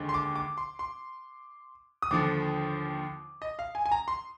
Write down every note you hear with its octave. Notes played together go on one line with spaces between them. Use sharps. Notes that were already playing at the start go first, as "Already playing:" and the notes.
Already playing: D#2 D3 G#3
C6
D6
D6
C6
C6
D#6
D#2 D3 F3 D6
D#5
F5
G#5
G#5
A#5
C6